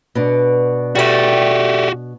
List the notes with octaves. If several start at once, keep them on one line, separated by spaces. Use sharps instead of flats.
B2 B3 D4
G3 A3 F#4 G4